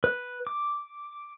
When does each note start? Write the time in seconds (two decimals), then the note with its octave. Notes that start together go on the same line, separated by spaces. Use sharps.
0.04 B4
0.47 D6